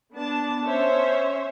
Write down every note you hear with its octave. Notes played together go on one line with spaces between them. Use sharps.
B3 D4 A5
C#4 C5 C#5 E5